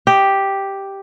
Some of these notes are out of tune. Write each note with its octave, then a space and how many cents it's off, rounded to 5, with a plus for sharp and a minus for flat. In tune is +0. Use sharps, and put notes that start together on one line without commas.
G4 +0 D#5 +10